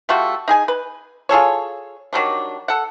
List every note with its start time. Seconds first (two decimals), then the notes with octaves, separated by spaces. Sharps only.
0.09 G3 A3 F4 F#4
0.48 D#4 G#4 G#5
0.68 B4
1.29 F4 G#4 A4 C#5
2.13 D#3 F#3 G3 D4
2.68 A4 F#5